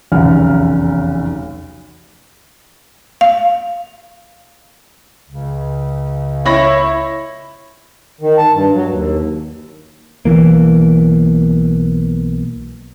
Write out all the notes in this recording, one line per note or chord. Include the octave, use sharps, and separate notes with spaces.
F1 B1 E2 C#3 F#5 F6
F5
C#2 C#3
E4 C#5 B5 A#6
D#3
A5
G2
F#3
D#2
B1 E3 A#3